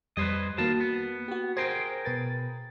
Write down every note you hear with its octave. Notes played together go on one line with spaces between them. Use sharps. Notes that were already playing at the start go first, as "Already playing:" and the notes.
F2 G3 B4 C5 D#5 G#6
D#3 A#3 F#4 F5 A5
B3
F#4 G4
G#4 A#4 C5 G5 C7
B2 B4 A6